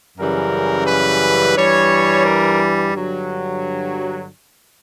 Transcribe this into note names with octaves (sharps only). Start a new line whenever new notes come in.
F#2 C#3 E3 G3 A#4
B4
G2 E3 G3 C#5
A#4
G2 D3 F#3